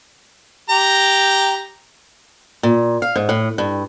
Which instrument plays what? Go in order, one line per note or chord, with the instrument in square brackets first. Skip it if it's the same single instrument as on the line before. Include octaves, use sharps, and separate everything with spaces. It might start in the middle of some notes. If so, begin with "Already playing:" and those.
[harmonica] G4 A#5
[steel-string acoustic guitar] A#2
F5
G#2
A2
G2